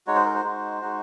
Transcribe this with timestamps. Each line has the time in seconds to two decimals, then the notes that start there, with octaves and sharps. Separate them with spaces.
0.07 G#3 D#4 F#4 C#5
0.15 C5
0.25 A#4
0.34 C5
0.44 G#3 D#4 F#4
0.81 G#3 D#4 F#4